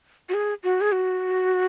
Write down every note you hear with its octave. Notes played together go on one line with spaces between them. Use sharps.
F#4
G#4
F#4
G#4
F#4